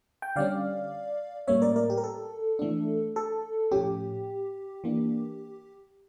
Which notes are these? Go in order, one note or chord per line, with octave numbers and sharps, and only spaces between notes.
G5
D3 G3 C#4 D5 F5
A2 G3 A#3 C#4 C#5 E5
A#4 D5
A#4 D5
G4
A#4
A4
E3 A3 D4
A4
A2 F3 C#4 G4
E3 A#3 D4